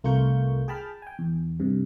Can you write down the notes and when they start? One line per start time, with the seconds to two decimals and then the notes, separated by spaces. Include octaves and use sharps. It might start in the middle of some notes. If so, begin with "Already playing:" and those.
0.04 C2 A3 F4 A#4 C#6 G6
0.68 G#4 G5 A5 B5 F6
1.02 G5 G#5
1.19 E2
1.60 G2 C3